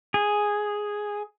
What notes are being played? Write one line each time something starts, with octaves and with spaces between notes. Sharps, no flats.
G#4